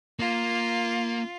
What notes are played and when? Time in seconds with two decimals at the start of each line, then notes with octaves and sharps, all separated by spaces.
0.19 A#3 F4